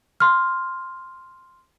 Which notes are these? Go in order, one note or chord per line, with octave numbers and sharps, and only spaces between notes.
C6 F6